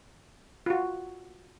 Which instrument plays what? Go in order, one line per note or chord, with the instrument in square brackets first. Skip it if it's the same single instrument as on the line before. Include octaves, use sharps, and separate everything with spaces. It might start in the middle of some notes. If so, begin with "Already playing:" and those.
[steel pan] F4 F#4